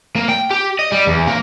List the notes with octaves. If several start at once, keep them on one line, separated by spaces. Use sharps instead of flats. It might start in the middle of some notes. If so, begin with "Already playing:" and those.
A#3
G5
G4
D#5
G3
E2
A#3